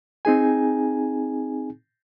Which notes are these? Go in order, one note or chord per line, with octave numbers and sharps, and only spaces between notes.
C4 D#4 G#4 G#5